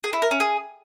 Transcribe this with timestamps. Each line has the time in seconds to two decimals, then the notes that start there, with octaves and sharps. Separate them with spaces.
0.04 G#4
0.13 E4
0.22 A#4
0.31 C#4
0.40 G#4